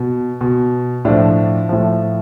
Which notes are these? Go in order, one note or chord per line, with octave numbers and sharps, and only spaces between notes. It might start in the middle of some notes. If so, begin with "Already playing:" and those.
Already playing: B2
B2
A2 F3 D4
A2 F3